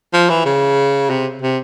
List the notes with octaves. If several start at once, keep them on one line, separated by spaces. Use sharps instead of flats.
F3
E3
C#3
C3
C3